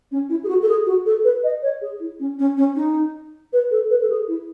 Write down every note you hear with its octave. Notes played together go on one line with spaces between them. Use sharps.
C#4
E4
G#4
F#4
A4
G#4
F#4
A4
B4
D#5
C#5
G#4
E4
C#4
C#4
C#4
D#4
B4
A4
B4
A4
G#4
E4